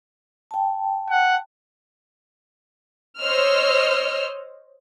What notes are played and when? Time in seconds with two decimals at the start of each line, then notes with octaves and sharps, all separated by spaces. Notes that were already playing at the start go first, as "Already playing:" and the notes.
0.51 G5 A5
1.10 F#5
3.20 C5 C#5 D#5 E6 F6